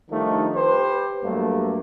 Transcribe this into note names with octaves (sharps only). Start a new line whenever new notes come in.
D#3 F3 G3 A3 D4 D#4
G4 B4 C5
G2 F#3 G3 A3 A#3